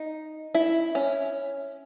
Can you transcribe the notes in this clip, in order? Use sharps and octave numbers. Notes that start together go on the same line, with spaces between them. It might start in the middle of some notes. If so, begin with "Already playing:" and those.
Already playing: D#4
E4
C#4